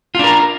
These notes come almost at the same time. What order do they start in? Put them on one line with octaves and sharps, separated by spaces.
F4 D4 A#4